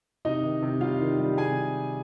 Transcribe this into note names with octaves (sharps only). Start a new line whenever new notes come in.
C3 D#4 D#5
D#3
C3
G3 F4 F5
D#3
G3
C3 G#4 G#5